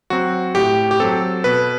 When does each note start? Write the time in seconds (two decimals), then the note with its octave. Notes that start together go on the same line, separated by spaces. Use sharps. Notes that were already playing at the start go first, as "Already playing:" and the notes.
0.10 F#3 C4 F#4
0.55 A2 G4
0.91 G4
1.00 F#3 C4 A4
1.44 B2 B4